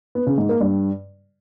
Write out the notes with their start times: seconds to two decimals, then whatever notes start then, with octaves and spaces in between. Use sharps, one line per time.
0.15 B3
0.27 C#3
0.38 G#2
0.49 A#3
0.61 G2